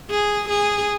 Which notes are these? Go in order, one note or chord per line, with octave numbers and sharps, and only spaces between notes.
G#4
G#4